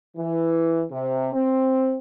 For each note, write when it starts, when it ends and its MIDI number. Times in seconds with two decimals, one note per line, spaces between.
0.16 0.82 52
0.91 1.27 48
1.32 1.98 60